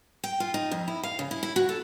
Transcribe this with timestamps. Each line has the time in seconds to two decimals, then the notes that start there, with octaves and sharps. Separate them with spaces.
0.24 G5
0.40 F4
0.54 D#4
0.71 F2
0.88 E4
1.03 F5
1.19 C#3
1.31 E4
1.43 E4
1.56 F#4
1.69 A4